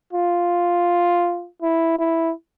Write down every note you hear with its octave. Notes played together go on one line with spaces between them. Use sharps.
F4
E4
E4